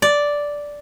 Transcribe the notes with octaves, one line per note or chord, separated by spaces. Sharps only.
D5